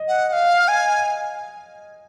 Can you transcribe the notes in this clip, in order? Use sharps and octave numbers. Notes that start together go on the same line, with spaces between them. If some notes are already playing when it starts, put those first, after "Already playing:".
Already playing: D#5
F#5
F#5
F5
G#5